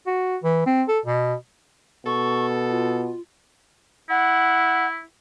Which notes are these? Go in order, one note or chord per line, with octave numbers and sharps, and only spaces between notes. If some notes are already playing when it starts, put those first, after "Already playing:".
F#4
E3
C4
A4
B2
B2 A4 C#6
F4
E4 F#5